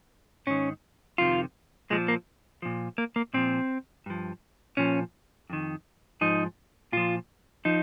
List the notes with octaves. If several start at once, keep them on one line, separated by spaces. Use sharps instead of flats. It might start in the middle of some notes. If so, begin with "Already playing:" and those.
G#2 D#3 C#4
F2 C3 D#3 F4
A#2 F3 G#3
A#3
A#2 F3
A#3
A#3
A#2 F3 C4
G2 F3
A#2 F3 C#4
F2 D#3
G#2 F3 D#4
A#2 F3 F4
F3 D#4